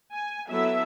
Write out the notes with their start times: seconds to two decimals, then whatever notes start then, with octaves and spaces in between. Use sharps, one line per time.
0.12 G#5
0.49 F#3 B3 E4 A4 E5